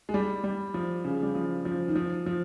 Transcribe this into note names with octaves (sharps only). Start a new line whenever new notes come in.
G#3
G3
G3
F3
C#3
G3
F3
F3
D#3
F3
F3